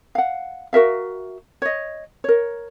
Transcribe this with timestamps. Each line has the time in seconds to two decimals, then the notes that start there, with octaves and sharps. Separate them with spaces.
0.15 F5 F#5
0.73 F#4 A#4 E5 F5
1.62 C#5 D#5
2.24 A#4 C#5